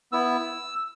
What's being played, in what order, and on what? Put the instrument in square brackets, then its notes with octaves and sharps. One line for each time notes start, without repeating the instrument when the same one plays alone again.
[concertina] B3 E4 E6